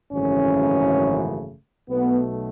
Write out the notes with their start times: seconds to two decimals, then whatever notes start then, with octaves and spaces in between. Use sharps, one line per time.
0.13 G#1 F#2 C#3 E3 A3 C#4
1.89 B1 B2 A3 B3